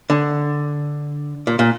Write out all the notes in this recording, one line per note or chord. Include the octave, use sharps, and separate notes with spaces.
D3
A#2
A#2